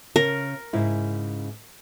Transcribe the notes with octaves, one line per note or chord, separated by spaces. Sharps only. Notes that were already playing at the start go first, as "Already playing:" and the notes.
C#3 A#4
G#2 C#3 E4